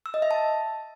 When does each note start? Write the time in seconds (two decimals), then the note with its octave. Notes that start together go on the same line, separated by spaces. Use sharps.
0.06 E6
0.14 D#5
0.22 E5
0.31 A5